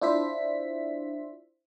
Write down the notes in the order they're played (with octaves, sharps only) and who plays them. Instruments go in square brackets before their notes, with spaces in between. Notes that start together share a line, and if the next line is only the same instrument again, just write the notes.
[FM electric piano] D4 E4 F4 C5 E5 B6